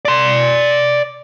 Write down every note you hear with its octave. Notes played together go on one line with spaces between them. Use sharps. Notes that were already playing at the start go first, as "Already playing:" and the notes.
D5 C6